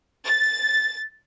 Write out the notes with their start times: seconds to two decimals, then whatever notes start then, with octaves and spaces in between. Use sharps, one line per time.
0.24 A6